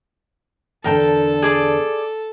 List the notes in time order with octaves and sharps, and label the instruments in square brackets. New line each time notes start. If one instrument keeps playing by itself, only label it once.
[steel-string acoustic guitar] E2 D3 D4 [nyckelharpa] A4 [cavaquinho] A#4 G5 A5
[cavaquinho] G#4 D5 A5